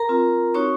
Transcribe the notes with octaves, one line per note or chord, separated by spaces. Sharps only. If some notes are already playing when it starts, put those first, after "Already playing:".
Already playing: A#4 A#5
C4 F4
C4 D#4 F#4 C#5 C#6